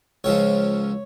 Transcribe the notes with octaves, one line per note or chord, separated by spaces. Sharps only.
C#2 C#3 F3 C#5